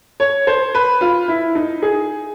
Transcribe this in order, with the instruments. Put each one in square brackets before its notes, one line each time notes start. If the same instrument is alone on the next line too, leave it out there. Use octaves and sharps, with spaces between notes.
[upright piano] C#5
C5
B4
F4
E4
D#4
G#4